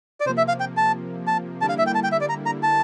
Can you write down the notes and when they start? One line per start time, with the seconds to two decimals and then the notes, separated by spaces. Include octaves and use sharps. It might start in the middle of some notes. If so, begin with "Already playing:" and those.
0.20 D5
0.25 C3 F3 A#3 C5
0.38 E5
0.48 F5
0.60 G5
0.77 A5
1.27 A5
1.61 D3 G3 A#3 E4 A5
1.69 F5
1.78 E5
1.87 G5
1.95 A5
2.04 G5
2.12 E5
2.21 D5
2.29 A#5
2.46 A#5
2.63 A5